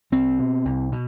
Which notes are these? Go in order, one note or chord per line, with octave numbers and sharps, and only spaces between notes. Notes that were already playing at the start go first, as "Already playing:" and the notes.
C2 C4
B2
C2
B2